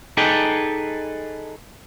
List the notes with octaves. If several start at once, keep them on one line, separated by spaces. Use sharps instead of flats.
D#4 G#4 A4 B4 D5 G5